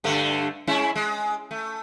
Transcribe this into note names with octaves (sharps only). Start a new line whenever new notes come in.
G2 D3 A3
G#3 C#4 E4
G#3
A3